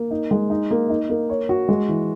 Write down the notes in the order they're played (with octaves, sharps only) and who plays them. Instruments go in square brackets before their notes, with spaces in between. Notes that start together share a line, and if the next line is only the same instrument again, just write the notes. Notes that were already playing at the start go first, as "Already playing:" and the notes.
Already playing: [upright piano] A#3
D#4
G#3
D#4
A#3
D#4
A#3
C#5
F#4
G#3
E3